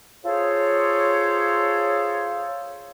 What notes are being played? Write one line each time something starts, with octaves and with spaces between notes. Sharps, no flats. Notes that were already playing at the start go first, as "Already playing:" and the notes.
F4 G#4 A4 C5 C#5